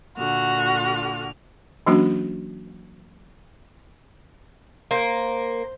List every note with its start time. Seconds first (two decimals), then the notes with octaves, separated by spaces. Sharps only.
0.18 A#2 D3 F#4 F6
1.87 E3 F#3 A#3 C#4 D4 F#4
4.91 A#3 C5